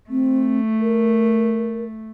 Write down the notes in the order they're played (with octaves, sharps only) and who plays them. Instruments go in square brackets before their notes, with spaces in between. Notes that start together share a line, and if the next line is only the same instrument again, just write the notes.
[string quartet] A3 [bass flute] C4
[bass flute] A#4